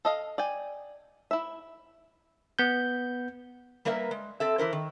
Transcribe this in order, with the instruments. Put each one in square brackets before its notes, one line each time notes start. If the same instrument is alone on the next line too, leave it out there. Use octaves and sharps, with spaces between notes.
[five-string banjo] A4 D#5 F5
D5 G5 G#5
E4 E5
[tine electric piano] B3 G6
[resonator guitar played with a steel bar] G3 A#3 A#4 B4 E5
G#3
C4 A4 E5
E3 E4 A#4 C5
D#3